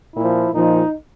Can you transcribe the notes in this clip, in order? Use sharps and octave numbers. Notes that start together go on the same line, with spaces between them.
A#2 F3 E4
A#2 F3 D#4